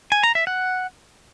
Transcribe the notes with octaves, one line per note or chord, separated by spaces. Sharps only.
G#5
A#5
E5
F#5